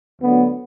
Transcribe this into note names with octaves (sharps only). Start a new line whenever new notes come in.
D2 D3 F#3 B3